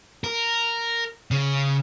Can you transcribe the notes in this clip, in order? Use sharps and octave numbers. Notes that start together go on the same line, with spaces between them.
A#4
C#3